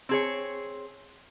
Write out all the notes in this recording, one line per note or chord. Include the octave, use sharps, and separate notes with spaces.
C4 G#4 C#5